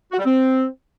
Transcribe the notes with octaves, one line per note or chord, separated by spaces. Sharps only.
F#4
G3
C4